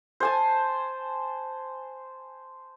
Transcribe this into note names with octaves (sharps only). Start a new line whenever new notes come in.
C5 G#5 A5